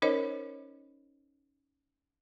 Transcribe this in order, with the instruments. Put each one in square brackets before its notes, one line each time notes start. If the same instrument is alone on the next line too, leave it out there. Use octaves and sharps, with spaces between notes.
[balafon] C#4 D#4 A#4 C5 C#5 D#5